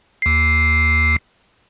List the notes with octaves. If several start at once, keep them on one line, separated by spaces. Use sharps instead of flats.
D#2 C7